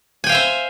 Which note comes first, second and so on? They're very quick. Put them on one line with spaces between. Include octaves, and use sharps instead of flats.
G#5 G5 F5 E5 C5